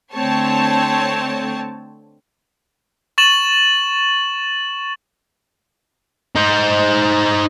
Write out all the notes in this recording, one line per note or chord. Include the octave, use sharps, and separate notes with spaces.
D3 A3 C4 C#5 A5
C#6 A6 E7 F#7
D#4 C5